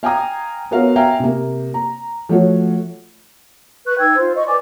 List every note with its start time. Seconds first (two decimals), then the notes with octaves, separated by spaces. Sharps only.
0.03 F5 G5 G#5 A#5 D#6
0.71 B3 F#4 A#4 C#5 F5
0.96 E5 F5 G5 G#5 A#5
1.19 C3 A#3
1.74 A#5
2.29 F3 A3 F#4 C#5
3.86 B4 C#6 F#6
3.98 D#4 G5 E6 G#6
4.16 F4 C5
4.36 D#5 C#6
4.48 B4 D5 G#5 D6